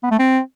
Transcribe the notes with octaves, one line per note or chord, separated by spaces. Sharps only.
B3
A3
C4